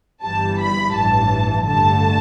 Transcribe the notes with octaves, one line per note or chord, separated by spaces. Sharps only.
G1 G2 E3 G3 A5
B5
A1 G2 E3 A5
G2 D3 A3 A5